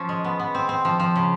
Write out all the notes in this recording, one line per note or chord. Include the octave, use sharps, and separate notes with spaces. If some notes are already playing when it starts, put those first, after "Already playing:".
Already playing: F3 C#4
G#3
B3
B3
C4
C4
F3
F3
C#3